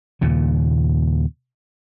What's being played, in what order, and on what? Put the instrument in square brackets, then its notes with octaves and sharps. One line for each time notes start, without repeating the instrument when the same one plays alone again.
[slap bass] D#2 A#2 C#3